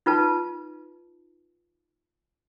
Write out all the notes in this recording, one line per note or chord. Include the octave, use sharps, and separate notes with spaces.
D#4 F4 B4 A5